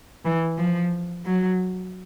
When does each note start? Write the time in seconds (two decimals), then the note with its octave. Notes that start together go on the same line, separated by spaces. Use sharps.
0.25 E3
0.58 F3
1.26 F#3